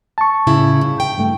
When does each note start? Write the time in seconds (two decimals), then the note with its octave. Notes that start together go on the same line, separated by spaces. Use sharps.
0.18 A5 C#6
0.47 A2 C#3 E4
0.81 G2
1.00 G5
1.18 G2 A3